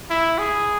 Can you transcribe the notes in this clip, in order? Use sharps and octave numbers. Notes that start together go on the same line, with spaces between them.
E4
G#4